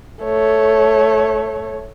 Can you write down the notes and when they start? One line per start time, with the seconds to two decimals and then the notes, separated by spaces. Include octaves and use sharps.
0.24 A3 C#5